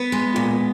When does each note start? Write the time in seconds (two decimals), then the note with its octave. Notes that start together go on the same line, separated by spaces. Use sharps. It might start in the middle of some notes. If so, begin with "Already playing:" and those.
Already playing: B3 B4
0.12 G#3
0.36 A#2